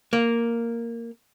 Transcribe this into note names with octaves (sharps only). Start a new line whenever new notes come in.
A#3